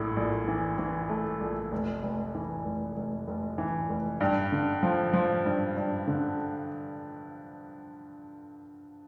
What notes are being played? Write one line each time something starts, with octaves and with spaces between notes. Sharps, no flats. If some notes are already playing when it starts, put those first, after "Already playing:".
Already playing: A#1 A2
A#1
E3
E3
A3
A#1
F1
F1
E3
F1
F1
F1
E3
F1
G2
D3
F3
F3
G2
G2
D3